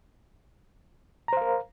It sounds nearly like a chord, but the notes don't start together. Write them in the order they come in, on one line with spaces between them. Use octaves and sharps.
A#5 C5 F5 A#4